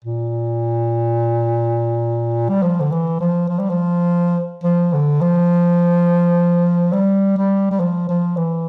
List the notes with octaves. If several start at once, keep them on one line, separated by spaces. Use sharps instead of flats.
A#2
G3
F3
D3
E3
F3
F3
G3
F3
F3
D3
F3
G3
G3
G3
F3
F3
E3